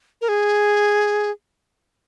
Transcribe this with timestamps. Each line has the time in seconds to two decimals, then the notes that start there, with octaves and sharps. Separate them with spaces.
0.21 A#4
0.29 G#4